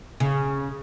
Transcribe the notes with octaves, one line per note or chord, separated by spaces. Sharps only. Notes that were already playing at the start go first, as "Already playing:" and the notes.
C#3